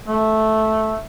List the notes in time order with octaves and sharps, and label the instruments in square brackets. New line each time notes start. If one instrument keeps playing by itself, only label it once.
[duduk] A3